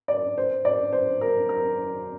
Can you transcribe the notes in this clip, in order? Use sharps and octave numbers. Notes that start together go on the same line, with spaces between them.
D5
C5
D5
C5
A#4
A#4